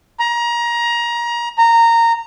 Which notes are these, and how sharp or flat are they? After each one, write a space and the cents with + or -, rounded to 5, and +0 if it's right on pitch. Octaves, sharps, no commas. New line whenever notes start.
A#5 +25
A#5 -15